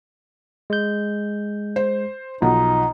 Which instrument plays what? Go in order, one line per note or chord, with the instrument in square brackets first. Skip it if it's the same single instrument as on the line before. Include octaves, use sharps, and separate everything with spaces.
[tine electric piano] G#3 G6
[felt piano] C5
[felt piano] B1 F3 F#5 [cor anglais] D#4